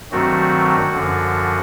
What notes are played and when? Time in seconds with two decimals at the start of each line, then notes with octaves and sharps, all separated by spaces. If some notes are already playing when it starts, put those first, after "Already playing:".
0.12 G2 D#3 F#3 A3 C4 F#4
0.93 F#2 D3 F3